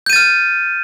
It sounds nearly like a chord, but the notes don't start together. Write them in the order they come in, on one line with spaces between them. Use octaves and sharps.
G6 D#7 A6 F6